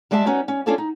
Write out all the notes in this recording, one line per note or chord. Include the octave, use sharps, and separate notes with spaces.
G3 G#3 D5 E5 G5 A5
B3 C#4 D#4 F#4
C#4
C#4 D4 F4 A4 C#5 D5
D#4